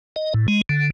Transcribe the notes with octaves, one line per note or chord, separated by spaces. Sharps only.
D#5
A2
G#3
D3